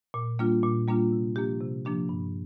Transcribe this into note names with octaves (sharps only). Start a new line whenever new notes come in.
A#2
G3 A#3 D4 F4
A#2
G3 A#3 D4 F4
C3
F3 A#3 D4 G4
C3
F3 A#3 D4 G4
G2